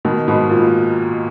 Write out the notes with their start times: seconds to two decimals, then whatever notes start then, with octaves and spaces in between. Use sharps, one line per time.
0.05 B2 D#3
0.27 G#2 B2
0.50 A#2